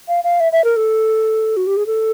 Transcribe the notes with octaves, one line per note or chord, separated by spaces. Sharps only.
F5
F5
E5
E5
A#4
A4
F#4
G4
G#4
A4